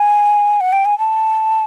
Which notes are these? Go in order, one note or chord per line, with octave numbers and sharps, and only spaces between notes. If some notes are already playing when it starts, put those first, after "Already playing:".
Already playing: G#5
F#5
G5
G#5
A5